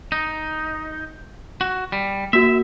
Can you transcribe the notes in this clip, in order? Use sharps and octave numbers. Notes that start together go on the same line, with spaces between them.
D#4
F#4
G3
A#3 F#4 E5